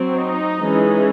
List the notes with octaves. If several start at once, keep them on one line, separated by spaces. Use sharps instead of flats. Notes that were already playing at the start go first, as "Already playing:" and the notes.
Already playing: F#3 C4
D#4
E3 G#3 C#4